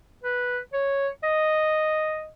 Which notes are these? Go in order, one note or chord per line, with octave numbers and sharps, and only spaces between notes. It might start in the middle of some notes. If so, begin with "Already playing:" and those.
B4
C#5
D#5